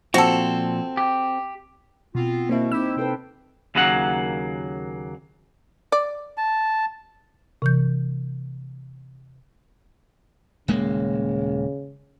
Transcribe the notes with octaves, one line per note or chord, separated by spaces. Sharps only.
A#2 F3 C4 F#4 A4
G4
B2 B3 C4 F4
B2 A#3 C4 E4
C4 D#4 E4 G4 E6
C3 A4 B4 C5 G5
D#2 C#3 F#3 A#3 F#5
D5
A5
C3 E3 G6
D#1 C#3 G#3 A#3